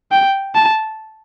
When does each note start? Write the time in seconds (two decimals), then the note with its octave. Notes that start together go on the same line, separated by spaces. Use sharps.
0.11 G5
0.55 A5